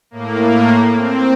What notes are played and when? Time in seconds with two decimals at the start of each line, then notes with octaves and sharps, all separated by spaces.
0.11 A2 A#3
0.93 C4